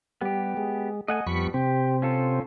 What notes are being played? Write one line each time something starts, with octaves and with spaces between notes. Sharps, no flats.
G3 B3 G4
G#3
A3 D#5 F#5 G#5
F2 F3 G3 B3 B5 C#6
C3 C4 G4
C#4 F4 A4